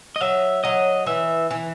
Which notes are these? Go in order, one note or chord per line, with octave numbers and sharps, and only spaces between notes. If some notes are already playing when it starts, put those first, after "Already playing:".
D#5
F#3 E5
F#3 D#5
E3 E5
E3